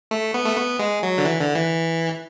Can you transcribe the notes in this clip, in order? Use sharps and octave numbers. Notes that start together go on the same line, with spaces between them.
A3
B3
A3
B3
G#3
F#3
D3
E3
D3
E3